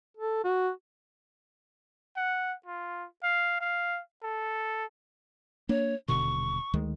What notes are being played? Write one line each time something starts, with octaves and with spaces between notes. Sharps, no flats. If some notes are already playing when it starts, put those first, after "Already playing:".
A4
F#4
F#5
F4
F5
F5
A4
A#3 D4 C#5
D#1 B2 D3 C#6
D2 D#3 G#3